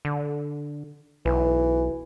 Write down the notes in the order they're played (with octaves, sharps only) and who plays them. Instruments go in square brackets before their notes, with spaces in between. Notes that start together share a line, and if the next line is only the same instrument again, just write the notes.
[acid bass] D3
[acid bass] B1 [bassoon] E3